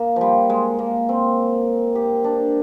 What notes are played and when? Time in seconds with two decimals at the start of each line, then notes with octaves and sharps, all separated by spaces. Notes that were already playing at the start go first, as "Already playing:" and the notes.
Already playing: A#3
0.16 F3 G3
0.50 G#3
0.79 A#3
1.09 C4
1.95 G4
2.24 D4